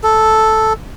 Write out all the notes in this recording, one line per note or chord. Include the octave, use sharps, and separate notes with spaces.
A4